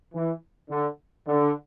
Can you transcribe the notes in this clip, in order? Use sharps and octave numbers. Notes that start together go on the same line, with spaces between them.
E3
D3
D3